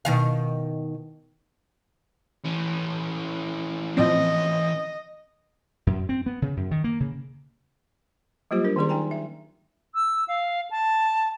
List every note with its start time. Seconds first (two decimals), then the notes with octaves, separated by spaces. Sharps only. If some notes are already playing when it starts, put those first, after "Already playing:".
0.05 B2 D#3 F5
2.45 E3 C#4
3.97 A2 F3 C4 D#5
5.87 F#2
6.09 C4
6.26 B3
6.42 C#3
6.57 F#2
6.71 D#3
6.84 A#3
7.00 C#3
8.51 F#3 G3 A#3 F4 G4 C5
8.64 D4 A#4
8.76 D#3 A#3 C#4 G#4 D5 C6
8.89 D#4 G5 G#5 A#5
9.11 E5
9.95 E6
10.28 F5
10.71 A5